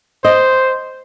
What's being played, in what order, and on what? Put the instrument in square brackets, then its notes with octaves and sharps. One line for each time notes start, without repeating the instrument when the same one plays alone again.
[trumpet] C5 [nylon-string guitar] D#5